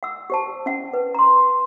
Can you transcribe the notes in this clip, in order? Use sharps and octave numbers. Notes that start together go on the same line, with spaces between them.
F#5 E6
G4 C5 A5
C#4 F#5
B4
A#5 C6